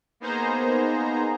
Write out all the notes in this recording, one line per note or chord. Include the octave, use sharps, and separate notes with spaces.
A#3 B3 D#4 G#4 C5 A#5